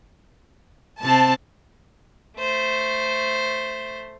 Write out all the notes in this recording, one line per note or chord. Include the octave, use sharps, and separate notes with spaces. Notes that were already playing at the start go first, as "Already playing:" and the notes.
C3 C4 A5
A3 C5